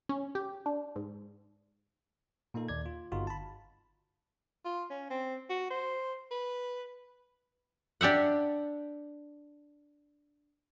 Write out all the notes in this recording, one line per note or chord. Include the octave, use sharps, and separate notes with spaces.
C#4
G4
D4
G#2
A#2 A#3 D#4 A4
D#2 D5 G#6
F4
G1 D#4 F4 F#4
A5 B5
F4
C#4
C4
F#4
C5
B4
D4 G4 E5 F#5